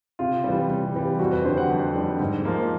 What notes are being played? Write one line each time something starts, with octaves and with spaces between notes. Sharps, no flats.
C3 F4
E3 G3
C3
E3 G3
F2 F#4
B4
D3 G3 C5
F#5
F2
D3 G3
G#2
F3 A#3